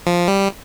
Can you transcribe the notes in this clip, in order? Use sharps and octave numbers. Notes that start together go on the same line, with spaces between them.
F3
G3